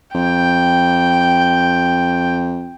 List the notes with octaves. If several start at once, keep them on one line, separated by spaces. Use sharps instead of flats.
F2 G5